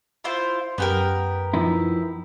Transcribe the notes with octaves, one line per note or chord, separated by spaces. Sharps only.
E4 F4 C5
F#2 B3 G4 A#4
F3 D#4 E4